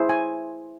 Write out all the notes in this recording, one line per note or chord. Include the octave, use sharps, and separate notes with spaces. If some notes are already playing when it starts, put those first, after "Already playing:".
Already playing: E4 G#4 C5
G#5